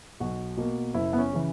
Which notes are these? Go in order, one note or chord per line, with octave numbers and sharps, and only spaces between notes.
B1 F#4
B2 A#3
F#1 E4
B3
C#4
C#3 E3